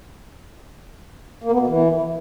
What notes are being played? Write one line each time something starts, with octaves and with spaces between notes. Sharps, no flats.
A#3
B3
B2
E3